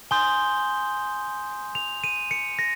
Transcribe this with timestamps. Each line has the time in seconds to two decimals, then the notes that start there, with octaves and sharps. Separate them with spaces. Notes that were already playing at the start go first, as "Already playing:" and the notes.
0.11 G#5 C6 D#6 G6 G7
1.75 F7
2.04 D#7
2.31 C#7
2.59 A#6